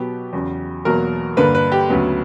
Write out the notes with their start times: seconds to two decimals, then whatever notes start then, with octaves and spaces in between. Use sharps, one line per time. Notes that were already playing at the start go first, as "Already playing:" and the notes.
Already playing: B2 F#3 B3 G4
0.33 E2 C#3 F#3
0.85 E2 B2 F#3 A#3 A#4
1.37 G2 D3 A#3 B4
1.55 B4
1.72 G4
1.90 D2 C#3 F#3 B3